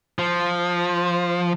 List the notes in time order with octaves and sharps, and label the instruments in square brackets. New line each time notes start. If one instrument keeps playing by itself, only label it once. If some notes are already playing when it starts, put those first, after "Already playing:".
[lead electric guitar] F3